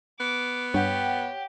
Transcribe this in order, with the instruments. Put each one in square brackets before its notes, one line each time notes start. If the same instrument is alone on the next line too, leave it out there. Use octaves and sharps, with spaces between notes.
[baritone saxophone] B3 [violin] D6
[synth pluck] G2 [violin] G4 [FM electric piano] C#5 F#5 G5